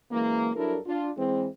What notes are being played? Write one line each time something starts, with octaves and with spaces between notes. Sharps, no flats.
F#2 E3 G#3 A#3
G2 F#3 D4 E4 A4 A#4
D4 F4
E3 G#3 C4